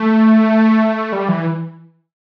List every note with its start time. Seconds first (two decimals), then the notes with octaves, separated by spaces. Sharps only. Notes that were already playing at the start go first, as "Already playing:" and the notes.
Already playing: A3
1.12 G3
1.29 E3